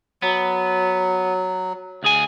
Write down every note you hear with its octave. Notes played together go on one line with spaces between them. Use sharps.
F#3 B3
D2 G#4 G#5